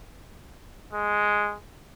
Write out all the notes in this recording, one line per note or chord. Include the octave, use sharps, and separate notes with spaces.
G#3